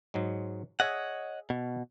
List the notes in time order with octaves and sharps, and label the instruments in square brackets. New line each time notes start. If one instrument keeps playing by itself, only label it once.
[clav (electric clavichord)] G#2 F#3 G#3
[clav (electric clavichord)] G#4 E5 G#5 [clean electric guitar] C#5 D#5 F#5
[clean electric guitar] B2